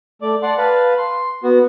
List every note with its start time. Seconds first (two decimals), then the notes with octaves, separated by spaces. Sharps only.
0.22 A3 D5 D6
0.43 D5 F#5 A5 C6 D6
0.58 B4 F5 A5 B5
0.98 C6
1.43 B3 F#4